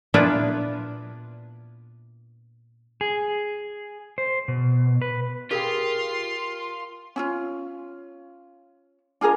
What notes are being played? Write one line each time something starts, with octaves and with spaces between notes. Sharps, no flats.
A#2 B3 D4 E4 F4 B4
G#4
C5
B2
B4
F4 G4 G#4 A#4 G5 C6
C#4 E4 F4
D4 F4 G#4 A#4